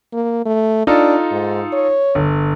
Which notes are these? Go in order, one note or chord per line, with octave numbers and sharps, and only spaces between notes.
A#3
A3
D4 D#4 F4 A4
G#2
C#5
G1